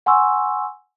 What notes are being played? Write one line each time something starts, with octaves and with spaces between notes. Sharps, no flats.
F#5 G#5 C6 C#6 E6